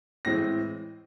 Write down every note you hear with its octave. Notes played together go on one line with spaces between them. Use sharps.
A2 E3 G#3 C4 A#6